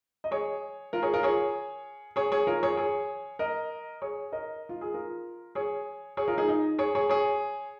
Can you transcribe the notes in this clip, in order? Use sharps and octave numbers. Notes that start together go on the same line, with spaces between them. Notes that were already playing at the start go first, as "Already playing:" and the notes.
D#5
G#4 C#5
F4 A#4
G#4 C#5
F4 A#4
G#4 C#5
G#4 C#5
G#4 C#5
F4 A#4
G#4 C#5
G#4 C#5
A#4 D#5
G#4 C#5
A#4 D#5
F4
G#4
F4 A#4
G#4 C#5
G#4 C#5
F4 A#4
D#4 G#4
D#4
G#4 C#5
G#4 C#5
G#4 C#5